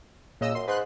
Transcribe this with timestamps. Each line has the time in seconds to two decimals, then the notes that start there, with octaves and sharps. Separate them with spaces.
0.41 A#2 C#3 D#5 E6
0.55 F#2 C6
0.67 G#2 B4 C6 F#6